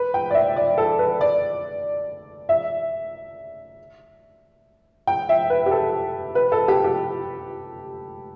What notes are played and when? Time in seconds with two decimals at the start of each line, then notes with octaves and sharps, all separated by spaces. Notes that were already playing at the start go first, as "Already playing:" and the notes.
Already playing: B4
0.14 G5
0.31 D5
0.34 E5
0.56 D5
0.78 A4
0.99 B4
1.21 D5
2.49 E5
5.07 G5
5.29 E5
5.50 B4
5.66 G4
5.71 A4
6.35 B4
6.52 A4
6.68 G4
6.84 G4